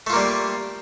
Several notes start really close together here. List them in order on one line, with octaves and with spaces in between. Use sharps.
A3 F4 A#3 G3